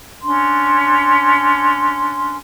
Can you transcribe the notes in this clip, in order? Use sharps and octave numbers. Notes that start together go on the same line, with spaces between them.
C#4 D4 C6